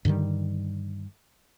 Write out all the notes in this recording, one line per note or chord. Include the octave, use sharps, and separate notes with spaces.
G2 D3 D#3 G3